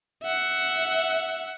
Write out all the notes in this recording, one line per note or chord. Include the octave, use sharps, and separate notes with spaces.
E5 F#5